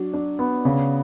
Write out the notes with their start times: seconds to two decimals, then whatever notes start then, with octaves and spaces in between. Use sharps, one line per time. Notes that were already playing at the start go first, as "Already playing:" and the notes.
Already playing: F#3 D4
0.13 D4
0.39 B3
0.65 C#3